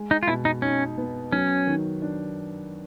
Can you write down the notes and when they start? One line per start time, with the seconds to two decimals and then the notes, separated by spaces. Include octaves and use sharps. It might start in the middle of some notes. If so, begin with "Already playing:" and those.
Already playing: G#3
0.11 D#4
0.23 F4
0.28 B2 E4
0.45 D#4
0.62 C#4 D#4
0.98 B3
1.32 F#3 C#4
1.67 D#3
2.02 D4